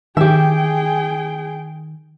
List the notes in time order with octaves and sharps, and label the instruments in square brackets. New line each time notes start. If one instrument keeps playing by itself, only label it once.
[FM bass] D#3 [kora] G4 E5 [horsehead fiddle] G#4 G5